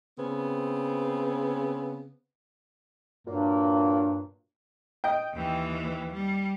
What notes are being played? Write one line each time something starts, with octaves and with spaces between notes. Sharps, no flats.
C#3 B3 C4
G2 A#2 F#3 A#3
D#5 G5
D#2 E3
G3